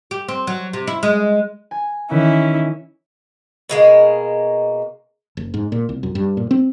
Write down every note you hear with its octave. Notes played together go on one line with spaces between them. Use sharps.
G4
C4
F#3
C3
E4
G#3
G#5
D#3 E3 C#4 E4
B2 G#3 A#3
F#1
G#2
A#2
C2
F#2
G2
A#2
C4